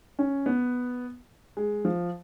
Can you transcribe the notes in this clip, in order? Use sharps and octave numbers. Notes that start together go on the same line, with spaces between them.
C#4
B3
G#3
F3